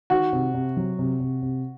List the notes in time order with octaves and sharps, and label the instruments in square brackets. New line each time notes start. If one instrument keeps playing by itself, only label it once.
[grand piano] D#3 [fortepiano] F#4
[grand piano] C3
C3
F#3
C3
C3
C3